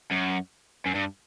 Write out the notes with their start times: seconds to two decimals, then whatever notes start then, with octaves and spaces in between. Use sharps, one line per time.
0.11 F#2
0.86 F#2
0.95 G2